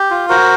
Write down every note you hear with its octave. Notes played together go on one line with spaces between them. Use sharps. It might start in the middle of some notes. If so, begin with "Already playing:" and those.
Already playing: G4
F4
F#4 A#4 C5